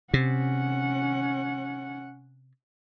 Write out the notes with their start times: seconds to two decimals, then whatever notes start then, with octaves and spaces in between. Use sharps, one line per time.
0.14 C3 C#4 F#5